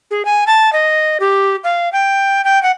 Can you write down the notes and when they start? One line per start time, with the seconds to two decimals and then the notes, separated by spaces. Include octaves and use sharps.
0.11 G#4
0.25 G#5
0.47 A5
0.73 D#5
1.20 G4
1.64 F5
1.93 G5
2.44 G5
2.63 F#5